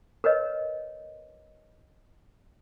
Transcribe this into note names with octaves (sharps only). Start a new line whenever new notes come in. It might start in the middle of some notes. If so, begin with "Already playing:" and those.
A#4 B4 C#5 D#5